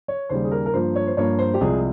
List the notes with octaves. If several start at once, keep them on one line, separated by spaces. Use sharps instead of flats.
C#5
D#2 C#3 G3 C5
G#4
A#4
A#4
G2 F3 A#3 C5
C#5
C5
G2 F3 A#3 C#5
C5
G4
C2 C3 F3 G#3 G#4